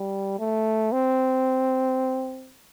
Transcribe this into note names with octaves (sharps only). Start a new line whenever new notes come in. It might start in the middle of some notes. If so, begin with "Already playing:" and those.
Already playing: G3
A3
C4